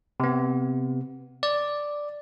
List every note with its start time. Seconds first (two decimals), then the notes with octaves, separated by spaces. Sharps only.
0.20 C3 B3
1.43 D5